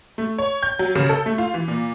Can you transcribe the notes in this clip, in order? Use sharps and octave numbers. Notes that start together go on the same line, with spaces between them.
A3
C#5
G6
F#3
C#3
A4
A3
F4
E3
A#2